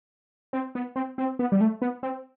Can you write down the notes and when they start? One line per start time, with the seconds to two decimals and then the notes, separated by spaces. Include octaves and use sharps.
0.53 C4
0.75 B3
0.96 C4
1.18 C4
1.39 B3
1.52 G3
1.61 A3
1.82 B3
2.03 C4